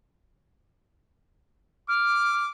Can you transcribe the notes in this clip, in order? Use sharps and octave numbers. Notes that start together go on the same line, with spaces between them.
D6 F6